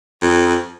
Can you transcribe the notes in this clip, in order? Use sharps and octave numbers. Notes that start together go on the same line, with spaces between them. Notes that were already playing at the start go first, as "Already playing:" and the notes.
F2